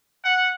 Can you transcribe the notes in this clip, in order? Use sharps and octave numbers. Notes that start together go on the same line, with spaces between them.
F#5